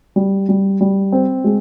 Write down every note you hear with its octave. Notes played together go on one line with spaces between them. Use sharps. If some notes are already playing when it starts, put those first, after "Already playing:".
G3
G3
G3
C4
G#3